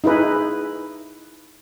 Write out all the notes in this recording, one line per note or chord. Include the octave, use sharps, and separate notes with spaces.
D#4 E4 G#4 B4